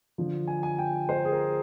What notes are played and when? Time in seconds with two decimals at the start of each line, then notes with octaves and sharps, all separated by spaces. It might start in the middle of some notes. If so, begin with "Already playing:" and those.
0.18 D3 F3
0.47 G#5
0.63 G#5
0.79 G5
1.09 C5
1.25 G#4
1.32 A#4